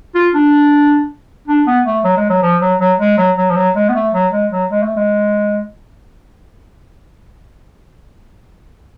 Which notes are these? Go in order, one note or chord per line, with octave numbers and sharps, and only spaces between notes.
F4
D4
D4
B3
A3
F#3
G#3
F#3
F3
F#3
F#3
G#3
F#3
F#3
F3
F#3
G#3
B3
A3
F#3
G#3
F#3
G#3
A3
G#3